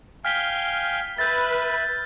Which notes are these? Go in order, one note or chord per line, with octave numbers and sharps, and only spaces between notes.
F5 G5 G#5 F6 B6 G7
B4 E5 G6 A6